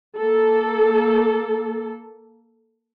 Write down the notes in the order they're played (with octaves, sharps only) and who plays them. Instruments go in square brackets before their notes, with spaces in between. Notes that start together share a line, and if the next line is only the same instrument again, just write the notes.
[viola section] A#3 A4